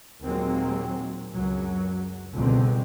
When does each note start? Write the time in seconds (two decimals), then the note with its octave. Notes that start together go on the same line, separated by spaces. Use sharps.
0.23 D#2 A#2 F#3 G#3 A#3 C4
1.34 C#2 F#2 F#3
2.34 C#2 B2 D3 G3 C4